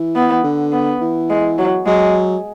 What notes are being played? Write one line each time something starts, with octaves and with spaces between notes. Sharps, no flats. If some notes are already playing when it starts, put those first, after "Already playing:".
Already playing: E3
B3
D3
B3
E3
G#3
F#3
F#3 G#3